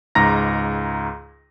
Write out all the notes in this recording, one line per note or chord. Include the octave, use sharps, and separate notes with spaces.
C#2 G#2 A#5 A#6